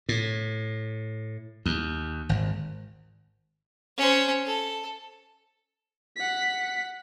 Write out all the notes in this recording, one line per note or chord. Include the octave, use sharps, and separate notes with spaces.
A2
D#2
G#1
C#4 C5
A4
F#5 B6